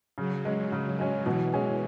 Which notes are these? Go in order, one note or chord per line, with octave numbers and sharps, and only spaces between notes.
C#3 F#3
G#3 C#4
C#3
G#3 C#4
B2 E3
G#3 C#4 G#4